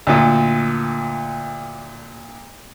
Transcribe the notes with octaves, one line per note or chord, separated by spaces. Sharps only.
D2 A#2